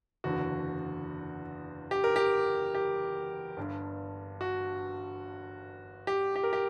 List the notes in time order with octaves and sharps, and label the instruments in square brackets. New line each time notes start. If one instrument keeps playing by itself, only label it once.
[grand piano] F#1 E2 D3 F#4
G4
A#4
G4
G4
G1 G2 D3
F#4
G4
G4
A#4
G4